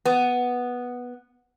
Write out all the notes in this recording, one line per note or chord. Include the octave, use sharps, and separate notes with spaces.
B3